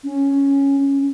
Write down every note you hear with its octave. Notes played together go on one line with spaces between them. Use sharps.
C#4